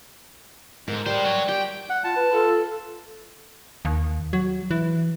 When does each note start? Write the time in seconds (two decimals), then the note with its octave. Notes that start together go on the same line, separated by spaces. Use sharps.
0.88 G#2 A4 A#4
1.06 G3 G#3 C5
1.24 F#4 C#5
1.49 G4 G5
1.90 F#5
2.04 F4 A5
2.16 B4
2.32 F4 A4
3.85 D#2
4.33 F#3
4.71 E3